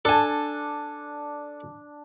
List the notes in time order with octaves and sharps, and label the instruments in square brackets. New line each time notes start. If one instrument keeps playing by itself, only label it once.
[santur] D4 [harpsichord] A4 G#5